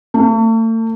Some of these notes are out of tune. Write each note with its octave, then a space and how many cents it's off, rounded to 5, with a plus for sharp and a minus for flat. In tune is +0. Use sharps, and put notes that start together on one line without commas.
A3 +40